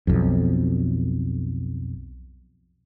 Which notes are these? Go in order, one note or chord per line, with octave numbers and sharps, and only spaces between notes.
B1 F2